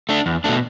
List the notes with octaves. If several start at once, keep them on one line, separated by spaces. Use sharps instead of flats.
A3 D4
E2
B2 A3 D4